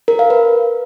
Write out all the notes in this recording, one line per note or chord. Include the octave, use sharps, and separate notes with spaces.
A#4
F5
B4